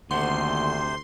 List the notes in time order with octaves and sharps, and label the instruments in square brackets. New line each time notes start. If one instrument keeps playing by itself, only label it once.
[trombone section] D2 [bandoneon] C3 C5 [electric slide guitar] D#3 A#3 F#5 [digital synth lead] C6